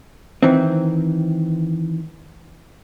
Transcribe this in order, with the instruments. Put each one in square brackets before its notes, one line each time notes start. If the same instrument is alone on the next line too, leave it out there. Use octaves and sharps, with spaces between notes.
[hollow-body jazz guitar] D#3 E3 C4